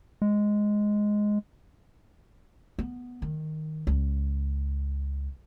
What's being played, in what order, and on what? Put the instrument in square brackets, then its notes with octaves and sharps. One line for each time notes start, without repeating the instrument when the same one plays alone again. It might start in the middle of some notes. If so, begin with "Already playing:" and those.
[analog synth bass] G#3
[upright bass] B3
D#3
C#2